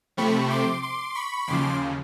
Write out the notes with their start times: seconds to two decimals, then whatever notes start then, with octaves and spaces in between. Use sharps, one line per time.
0.17 C3 F3 A3 C4 B5 C#6
0.50 C6 D6
0.82 C6 D6
1.15 B5 C#6
1.48 D#2 C#3 F3 C6 D6